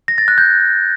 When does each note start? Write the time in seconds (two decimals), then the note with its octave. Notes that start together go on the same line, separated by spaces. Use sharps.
0.08 A#6
0.18 A6
0.28 F#6
0.38 G6